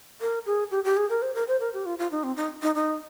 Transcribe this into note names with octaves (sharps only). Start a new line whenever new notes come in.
A#4
G#4
G4
G4
G#4
A#4
C5
A#4
C5
A#4
G4
F4
F4
D#4
C4
D#4
D#4
D#4